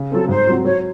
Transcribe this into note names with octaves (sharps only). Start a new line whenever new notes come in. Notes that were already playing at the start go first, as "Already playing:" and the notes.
Already playing: C#3
F#3 C4 A4
G#2 C5
F#3 C4 F#4
F#3 C#5